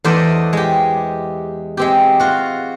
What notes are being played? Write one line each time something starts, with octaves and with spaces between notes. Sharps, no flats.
E2 A3 C5 D5 D#5
G#3 G4
G#3 C4 G4
F4 F#4